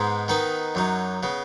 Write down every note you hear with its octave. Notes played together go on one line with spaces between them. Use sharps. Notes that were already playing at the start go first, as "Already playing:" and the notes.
Already playing: G#2 G#3 B3 D#4
D#3 B3 D#4 B4 D#5
F#2 F#3 D#4
C#3 B3